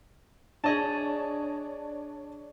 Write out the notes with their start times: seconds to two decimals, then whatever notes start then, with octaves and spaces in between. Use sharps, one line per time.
0.64 D4 G#4 C#5 D#5 A5